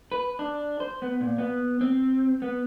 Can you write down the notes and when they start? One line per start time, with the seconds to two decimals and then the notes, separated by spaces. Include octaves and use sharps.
0.12 B4
0.39 D4
0.80 C5
1.02 B3
1.21 A#2
1.38 B3
1.81 C4
2.42 B3